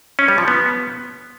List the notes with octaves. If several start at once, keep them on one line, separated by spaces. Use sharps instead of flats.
C#4
G3
F3
B3